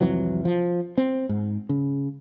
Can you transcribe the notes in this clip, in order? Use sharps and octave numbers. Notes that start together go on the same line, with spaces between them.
C2 F2 E3 F#3
F3
C4
G#2
C#3